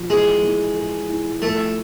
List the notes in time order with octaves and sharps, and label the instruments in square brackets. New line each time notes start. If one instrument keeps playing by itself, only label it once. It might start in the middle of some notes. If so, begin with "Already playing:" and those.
Already playing: [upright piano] F3
[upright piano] E3 [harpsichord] G#3
[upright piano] E3
G#4
E4
[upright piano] F3 [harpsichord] A3